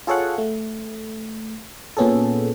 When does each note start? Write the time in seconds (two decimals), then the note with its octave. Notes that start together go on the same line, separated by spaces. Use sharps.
0.07 F4 G#4 A4 C#5 F5 F#5
0.38 A3
1.97 A#2 B3 C#4 G#4 A4